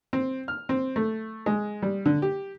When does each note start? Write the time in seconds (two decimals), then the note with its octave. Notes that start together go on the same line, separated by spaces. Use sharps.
0.13 C4
0.48 F6
0.69 C4
0.96 A3
1.46 G#3
1.82 G3
2.06 D3
2.22 G4